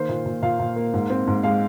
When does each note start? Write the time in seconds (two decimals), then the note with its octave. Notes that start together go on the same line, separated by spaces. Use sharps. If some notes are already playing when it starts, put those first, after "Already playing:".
Already playing: D#3 A#3 C5
0.09 A#2
0.26 A#2
0.43 A#2 F5
0.60 A#2
0.76 A#3
0.94 G#2
1.10 C4
1.27 G#2
1.43 G#3 F5